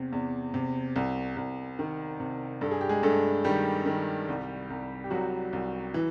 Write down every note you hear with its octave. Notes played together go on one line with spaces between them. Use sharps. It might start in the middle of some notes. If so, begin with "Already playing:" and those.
Already playing: E2 C3 C4
E2
C3
C2
C2
D#3
C3
G2 A4
G#4
G4
G#3 G#4
G2 A3 A4
D#3 G3 G4
D#3
C2
C2
G4
C2 F#3 F#4
C2
E3